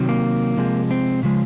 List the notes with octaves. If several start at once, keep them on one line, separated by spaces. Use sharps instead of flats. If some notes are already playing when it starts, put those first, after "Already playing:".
Already playing: C3 D#3 F#3
A#3
C3 F3 G#3
C4
C#3 F3 G#3